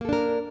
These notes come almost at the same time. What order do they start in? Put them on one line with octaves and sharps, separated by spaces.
A#3 A4 D4 A#4